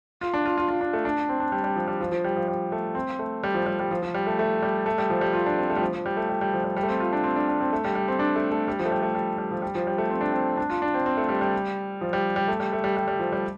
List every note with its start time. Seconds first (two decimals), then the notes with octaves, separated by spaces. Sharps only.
0.21 F4
0.34 D4
0.45 F4
0.58 F4
0.68 F4
0.81 D4
0.93 A3
1.05 D4
1.29 C4
1.40 D4
1.52 G3
1.64 G3
1.76 F3
1.88 G3
2.01 F3
2.12 F3
2.24 G3
2.36 F3
2.48 G3
2.72 A3
2.95 C4
3.19 A3
3.43 G3
3.54 F3
3.66 G3
3.79 G3
3.91 F3
4.03 F3
4.14 G3
4.27 A3
4.39 A3
4.62 G3
4.86 A3
4.98 G3
5.10 F3
5.21 G3
5.33 F4
5.46 D4
5.58 C4
5.70 A3
5.76 G3
5.81 F3
5.94 F3
6.06 G3
6.17 A3
6.29 G3
6.41 G3
6.53 F3
6.64 G3
6.76 G3
6.83 A3
6.89 C4
7.00 F4
7.13 D4
7.24 C4
7.36 D4
7.49 D4
7.61 C4
7.73 A3
7.84 G3
7.95 G3
8.08 C4
8.19 D4
8.36 A3
8.52 A3
8.68 G3
8.79 F3
8.85 A3
8.91 G3
9.03 A3
9.15 G3
9.38 G3
9.51 F3
9.62 G3
9.75 F3
9.87 G3
9.98 A3
10.10 C4
10.21 D4
10.32 C4
10.57 D4
10.70 F4
10.82 D4
10.94 C4
11.06 C4
11.17 A3
11.29 G3
11.41 G3
12.01 F3
12.13 G3
12.36 G3
12.48 A3
12.60 G3
12.73 A3
12.84 G3
12.97 G3
13.08 G3
13.19 F3
13.32 G3